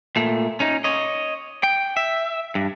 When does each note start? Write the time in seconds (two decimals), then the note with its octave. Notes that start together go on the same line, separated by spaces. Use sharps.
0.16 A#2 A3
0.60 C#4 D#4
0.84 C#5 D#5
1.63 G5
1.97 E5
2.55 G2